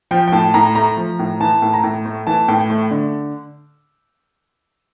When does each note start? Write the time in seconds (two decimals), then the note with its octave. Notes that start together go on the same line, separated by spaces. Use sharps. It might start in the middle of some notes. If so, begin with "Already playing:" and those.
0.11 F3 G5
0.28 G5
0.32 A2 A5
0.54 A2 A#5
0.75 A3 A#5
0.97 F3
1.19 A2
1.40 E3 A5
1.62 A2
1.73 A#5
1.83 A2
2.05 A3
2.27 E3 A5
2.48 A2 G5
2.70 A3
2.91 D3